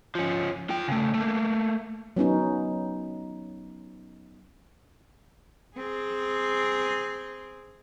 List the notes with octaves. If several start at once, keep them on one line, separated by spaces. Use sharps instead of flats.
F3 C#4
F4 G5
C#3 A3
A3 A#3
F#3 B3 C#4 D#4
C4 G#4